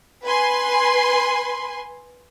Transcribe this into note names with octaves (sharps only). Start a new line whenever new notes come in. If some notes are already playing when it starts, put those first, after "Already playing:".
B4 G#5 C6